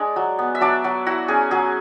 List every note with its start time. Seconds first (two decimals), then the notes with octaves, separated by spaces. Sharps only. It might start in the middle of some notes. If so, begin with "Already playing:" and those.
Already playing: G#3 D4 D5
0.16 F#3
0.39 B3
0.55 E5
0.61 F#3 D4 D5
0.84 F#3
1.06 E4 F#4
1.28 C#4 G#4
1.51 F#3 G#4